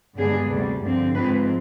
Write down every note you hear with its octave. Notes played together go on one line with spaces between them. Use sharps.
G2 D3 G#3 B3 D4 G#4
D2 C3 G3
G2 D3 F3 C4
G#2 F3 G#3 C4 B4